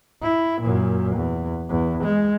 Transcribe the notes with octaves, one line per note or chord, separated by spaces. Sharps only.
E4
F#2 A#2
E2
E2
G#3